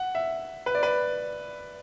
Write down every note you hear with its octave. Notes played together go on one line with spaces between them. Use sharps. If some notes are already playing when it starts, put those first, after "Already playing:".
Already playing: F#5
E5
B4
D5
B4